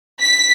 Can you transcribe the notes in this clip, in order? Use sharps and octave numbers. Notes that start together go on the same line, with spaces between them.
B6